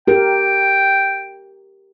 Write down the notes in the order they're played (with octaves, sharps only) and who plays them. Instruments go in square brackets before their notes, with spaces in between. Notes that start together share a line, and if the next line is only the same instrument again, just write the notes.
[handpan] G4 A#4 [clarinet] G5